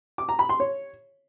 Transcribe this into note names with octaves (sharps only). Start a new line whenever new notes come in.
D6
A#5
B5
C6
C#5